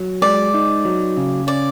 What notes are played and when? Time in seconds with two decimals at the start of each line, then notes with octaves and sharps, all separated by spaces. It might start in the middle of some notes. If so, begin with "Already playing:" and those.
Already playing: F#3
0.22 G#3 D5
0.54 D#4
0.85 F#3
1.17 C#3
1.47 C#4 D5